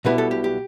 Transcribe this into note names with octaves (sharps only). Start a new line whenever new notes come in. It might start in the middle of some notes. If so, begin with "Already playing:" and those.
B1 B2 G3 B3 E4 B4
A4
G4
G4